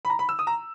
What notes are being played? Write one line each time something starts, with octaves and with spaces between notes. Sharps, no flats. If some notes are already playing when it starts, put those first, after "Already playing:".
B5
A#5
B5
E6
D#6
A#5